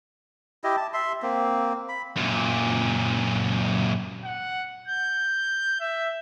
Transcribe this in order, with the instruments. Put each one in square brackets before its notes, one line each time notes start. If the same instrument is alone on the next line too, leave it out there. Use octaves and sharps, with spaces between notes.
[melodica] E4 G4 D#5
A5
E5 C6
A#3 C4
B5
[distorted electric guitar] F#2 A#2
[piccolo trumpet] F#5
G6
E5